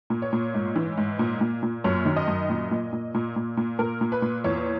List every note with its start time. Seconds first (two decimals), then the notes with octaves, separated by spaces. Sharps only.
0.10 A#2
0.22 C#5
0.33 A#2
0.54 G#2
0.76 E3
0.97 G#2
1.19 A#2
1.41 A#2
1.63 A#2
1.84 F#2 C#5
2.05 D#3
2.16 D#5
2.28 F#2
2.50 A#2
2.71 A#2
2.93 A#2
3.14 A#2
3.36 A#2
3.57 A#2
3.79 A#2 A#4
4.01 A#2
4.12 B4
4.22 A#2
4.44 E2 C#5